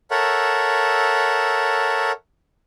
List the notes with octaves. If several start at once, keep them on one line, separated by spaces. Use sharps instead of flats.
A4 A#4 C#5 E5 F#5